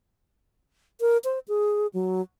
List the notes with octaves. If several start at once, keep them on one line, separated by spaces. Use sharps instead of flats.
A#4
C5
G#4
F#3